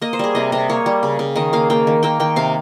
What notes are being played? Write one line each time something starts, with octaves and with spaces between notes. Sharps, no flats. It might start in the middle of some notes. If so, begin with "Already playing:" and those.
A#3 D#5
C5
G3 G#4
C3 D#5
C3 D#5
A#3 C#5
G3
C#3
C#3
D#3 D#5
A#3 F5
A#3 G5
D#3
A#3 G5
D#3 G5
C3 F5